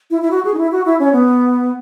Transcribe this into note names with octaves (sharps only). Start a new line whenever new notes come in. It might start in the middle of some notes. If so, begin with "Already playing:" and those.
E4
E4
F#4
G#4
D#4
E4
F#4
E4
C#4
B3